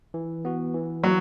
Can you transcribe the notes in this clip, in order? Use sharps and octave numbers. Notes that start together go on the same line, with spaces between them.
E3
B3 F#4
E3
F#3 A#3